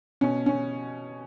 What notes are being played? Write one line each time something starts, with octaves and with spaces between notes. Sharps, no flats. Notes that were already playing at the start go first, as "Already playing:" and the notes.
B2 C#4
C#4